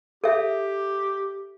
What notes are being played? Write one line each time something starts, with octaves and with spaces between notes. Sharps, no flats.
G4 A4 E5